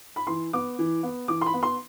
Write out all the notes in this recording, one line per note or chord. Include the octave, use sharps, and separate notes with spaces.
B5
E3 C6
B3 D6
E3
B3
E3 D6
C6
B5
B3
C6